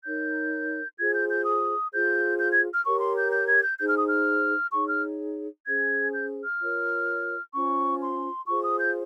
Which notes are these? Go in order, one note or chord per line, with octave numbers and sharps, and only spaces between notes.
D#4 A#4 C#5 G6
F4 G#4 C5 G#6
G6
G6
D#6
F4 G#4 C5 G6
G6
G#6
F6
G4 A#4 C#5 C#6
C6
G6
G6
G#6
G6
D#4 G#4 C5 G6
F6
D#6
F6
D#4 G#4 C#5 C#6
F6
C#4 G#4 C5 G#6
G6
F6
F4 A#4 C#5
C#4 F4 C5 C#6
C6
F4 G#4 C5 C#6
D#6
G6